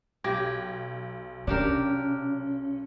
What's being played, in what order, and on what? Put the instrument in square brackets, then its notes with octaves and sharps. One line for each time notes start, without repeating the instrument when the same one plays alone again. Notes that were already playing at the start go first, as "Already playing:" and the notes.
[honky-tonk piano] B1 G#6 A#6 [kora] G4
[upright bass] C3 [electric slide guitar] C#4 [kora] D4 G4 A#4